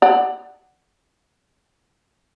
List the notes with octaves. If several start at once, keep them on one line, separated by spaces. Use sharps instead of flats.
D5 F#5